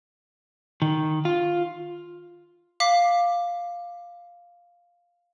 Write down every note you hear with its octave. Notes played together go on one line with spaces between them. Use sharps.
D#3
F4
F5 D6 B6